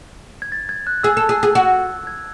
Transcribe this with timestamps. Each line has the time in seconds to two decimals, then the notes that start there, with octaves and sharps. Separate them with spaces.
0.42 G#6
0.52 A6
0.69 G#6
0.87 F#6
1.03 G#4 E6
1.17 A4
1.29 G#4
1.43 G#4
1.55 F#4
2.07 G#6